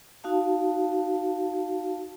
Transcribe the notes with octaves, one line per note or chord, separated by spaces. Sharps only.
D#4 F#4 F5 A5